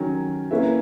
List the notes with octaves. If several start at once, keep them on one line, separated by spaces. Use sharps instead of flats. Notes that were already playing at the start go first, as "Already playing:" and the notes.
Already playing: D#3 F#3 C#4
A#3 C#4 E4 B4 E5